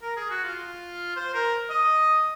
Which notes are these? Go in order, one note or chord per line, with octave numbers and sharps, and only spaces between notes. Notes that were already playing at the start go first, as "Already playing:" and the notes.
A#4
G#4
F#4
F4
C5
A#4
D#5